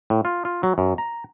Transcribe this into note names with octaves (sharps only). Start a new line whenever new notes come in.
A2
F4
F4
F#3
F#2
A#5